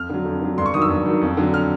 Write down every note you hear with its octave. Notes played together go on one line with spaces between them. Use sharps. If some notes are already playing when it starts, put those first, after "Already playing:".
Already playing: F2 F6
D3 F#3
F2
D3 F#3
G2 C6
C#6
D#3 F#3 D#6
E6
G2
D#3 F#3
F2
D3 F#3
F6